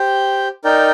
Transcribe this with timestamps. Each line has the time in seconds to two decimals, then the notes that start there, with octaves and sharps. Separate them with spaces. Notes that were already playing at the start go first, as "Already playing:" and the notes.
Already playing: G4 C5 G5
0.64 D#4 A#4 D5 G5